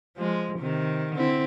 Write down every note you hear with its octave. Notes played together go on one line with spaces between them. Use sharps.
F3 G#3
C3 D#3
D3 C4 E4